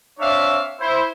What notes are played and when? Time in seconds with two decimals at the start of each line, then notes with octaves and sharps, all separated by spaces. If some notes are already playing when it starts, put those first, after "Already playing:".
0.20 C4 D4 C#5 E5 F5
0.80 E4 C5